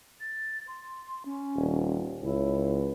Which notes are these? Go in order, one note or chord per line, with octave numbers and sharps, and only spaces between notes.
A6
C6
C#4
D#1
C#2 E4